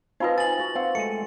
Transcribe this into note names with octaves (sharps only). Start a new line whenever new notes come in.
C4 D#4 F4 B4 D#5 F5
G#5 A6 F#7
F#4
C4 F5 F#5
G#3 A3 C#7